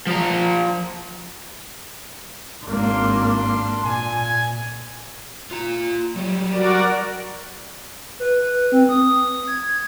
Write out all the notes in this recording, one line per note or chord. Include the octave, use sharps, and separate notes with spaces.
F3 A#5
G#1 A#3 D4 C6
A#2 G#5
F4 A#5
F#3 G3
F#4 A#4 D5
B4
C4
D#6
G#6